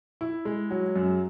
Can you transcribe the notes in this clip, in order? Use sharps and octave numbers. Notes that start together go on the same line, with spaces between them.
E4
G#3
F#3
F#2